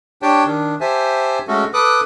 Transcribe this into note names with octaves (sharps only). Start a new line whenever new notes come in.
D4 G4 C#5 G5 A5
D#3 D4
G4 C5 E5 G#5 A5
G#3 A3 C#4 F#4 A4
A4 B4 D6 D#6 F#6